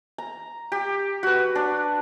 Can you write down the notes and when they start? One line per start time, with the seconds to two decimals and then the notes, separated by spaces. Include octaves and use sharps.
0.18 A#5
0.72 G4
1.23 F#4 B4
1.55 D4